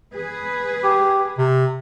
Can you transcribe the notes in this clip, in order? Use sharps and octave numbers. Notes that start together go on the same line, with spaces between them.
G#4 B4
G4
C3